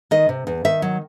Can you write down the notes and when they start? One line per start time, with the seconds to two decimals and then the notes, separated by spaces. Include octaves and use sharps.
0.11 D#3 D#5
0.29 C3
0.47 E2
0.65 D#3 E5
0.82 F#3